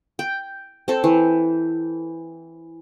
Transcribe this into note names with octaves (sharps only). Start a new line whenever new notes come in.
G5
C4 A4
E3